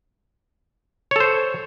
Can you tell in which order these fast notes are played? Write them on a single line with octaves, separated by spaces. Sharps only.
C#5 A4 C5